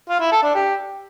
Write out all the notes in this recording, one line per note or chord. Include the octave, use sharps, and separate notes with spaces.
F4
E4
A4
D4
G4